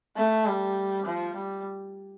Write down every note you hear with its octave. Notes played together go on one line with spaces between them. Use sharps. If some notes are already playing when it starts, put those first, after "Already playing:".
A3
G3
F3
G3